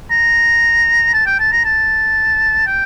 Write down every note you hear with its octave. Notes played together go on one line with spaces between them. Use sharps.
A#5
A5
G5
A5
A#5
A5
G5